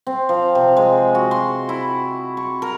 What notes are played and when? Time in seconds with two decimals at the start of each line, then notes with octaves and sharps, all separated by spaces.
0.07 C4
0.29 F3
0.55 C3
0.77 G#3
1.15 F#4
1.31 C6
1.69 E4
2.37 C#6
2.62 A#4